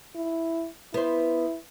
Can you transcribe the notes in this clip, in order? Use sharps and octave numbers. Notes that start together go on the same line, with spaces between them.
E4
B3 E4 C5